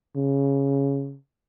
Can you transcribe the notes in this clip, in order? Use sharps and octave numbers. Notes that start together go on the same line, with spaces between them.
C#3